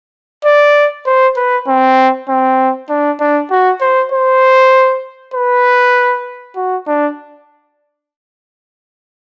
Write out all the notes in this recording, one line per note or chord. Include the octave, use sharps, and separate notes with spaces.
D5
C5
B4
C4
C4
D4
D4
F#4
C5
C5
B4
F#4
D4